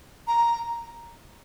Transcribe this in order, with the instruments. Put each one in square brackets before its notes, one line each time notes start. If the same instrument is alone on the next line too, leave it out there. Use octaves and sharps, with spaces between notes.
[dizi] A#5